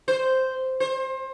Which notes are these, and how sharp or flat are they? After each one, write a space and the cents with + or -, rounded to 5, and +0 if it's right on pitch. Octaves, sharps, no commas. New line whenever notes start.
C5 -5
C5 +30